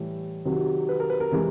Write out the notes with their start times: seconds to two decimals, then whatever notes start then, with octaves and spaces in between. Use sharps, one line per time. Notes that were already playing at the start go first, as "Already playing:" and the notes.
Already playing: A2 E3 G3
0.45 C3 D#3 F#3
0.89 B4
1.00 A#4
1.10 B4
1.20 A#4
1.32 C3 E3 G#3